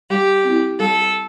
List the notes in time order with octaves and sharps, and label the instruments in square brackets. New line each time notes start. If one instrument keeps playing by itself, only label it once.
[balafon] G3 [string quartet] G4
[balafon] C4 E4
[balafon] G3 [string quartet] A4